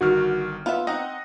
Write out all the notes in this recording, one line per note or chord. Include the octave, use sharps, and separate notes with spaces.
G1 D#3 F#4 F6
B3 F4 B4 E5
C4 D#4 D#5 F#5